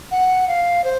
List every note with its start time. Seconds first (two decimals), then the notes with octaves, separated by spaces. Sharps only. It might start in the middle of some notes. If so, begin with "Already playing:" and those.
0.11 F#5
0.48 F5
0.84 C5